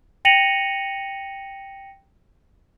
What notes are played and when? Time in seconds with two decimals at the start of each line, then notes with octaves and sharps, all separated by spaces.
0.25 G5 A#6 C#7 D#7 F7 F#7